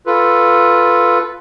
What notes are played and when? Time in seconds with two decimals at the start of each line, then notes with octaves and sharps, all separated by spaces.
0.07 F4 A4 B4